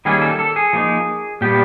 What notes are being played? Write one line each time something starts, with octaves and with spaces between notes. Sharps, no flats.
D#3 G3 A#3 C#4 G#4
A4
A4
G#4
F3 A#3 D#4
A#2 G3 B3 D4 G4